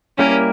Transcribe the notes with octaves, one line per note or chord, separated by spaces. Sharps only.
G3 A#3 C#4 E4 G4 A#4